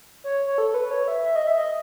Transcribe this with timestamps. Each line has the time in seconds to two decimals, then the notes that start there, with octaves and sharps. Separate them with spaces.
0.24 C#5
0.47 C#5
0.58 A4
0.74 B4
0.91 C#5
1.08 E5
1.25 E5
1.36 D#5
1.47 E5
1.58 D#5